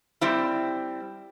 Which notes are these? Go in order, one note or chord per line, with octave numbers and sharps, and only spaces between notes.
G3 C4 E4